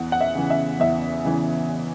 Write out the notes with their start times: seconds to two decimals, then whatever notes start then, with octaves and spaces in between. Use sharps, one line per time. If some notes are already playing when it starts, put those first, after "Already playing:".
Already playing: E2 F#5
0.12 F#5
0.21 E5
0.35 C#3 E3
0.50 E5
0.80 E2 E5
1.25 C#3 E3